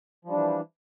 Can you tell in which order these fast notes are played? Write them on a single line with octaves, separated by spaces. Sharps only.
F3 G3 D4 E3